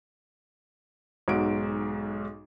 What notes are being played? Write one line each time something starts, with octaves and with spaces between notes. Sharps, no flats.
B1 G#2 F#4 D7